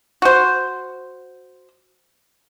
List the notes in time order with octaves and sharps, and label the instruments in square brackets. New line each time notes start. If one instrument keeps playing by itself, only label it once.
[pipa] F#4 C5